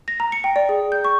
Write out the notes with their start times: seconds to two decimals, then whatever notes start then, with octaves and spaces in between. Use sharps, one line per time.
0.08 A#6
0.20 A#5
0.32 C#7
0.44 G5
0.56 D5
0.69 G#4
0.92 G6
1.04 C#6